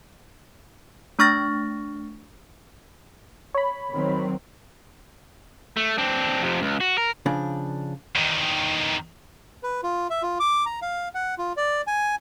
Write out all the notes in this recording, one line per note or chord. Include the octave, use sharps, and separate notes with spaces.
A3 D4 C#6 F6 A6 A#6
C#5 B5
D#3 F#3 C4
A3
C4 D4
F2 C3
C#2
F#4
A#4
C#3 F3 D4
E2 D#3
B4
F4
E5
F4
D6
A#5
F5
F#5
F4
D5
G#5